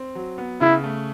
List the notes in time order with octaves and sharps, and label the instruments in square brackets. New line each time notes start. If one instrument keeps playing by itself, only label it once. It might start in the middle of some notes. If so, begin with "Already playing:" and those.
Already playing: [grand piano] C4
F#3
B3
[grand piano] C#3 [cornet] E4
[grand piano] A3